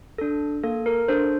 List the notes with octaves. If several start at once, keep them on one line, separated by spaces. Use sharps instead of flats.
D4 A4
A#3 A4
A#4
D4 A4 C5